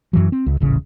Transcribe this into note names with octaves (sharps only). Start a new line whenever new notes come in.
F#2 E3 F#3
C4
C#2
D#1 A1 C#3